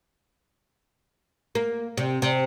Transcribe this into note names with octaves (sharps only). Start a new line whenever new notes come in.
A#3
C3
C3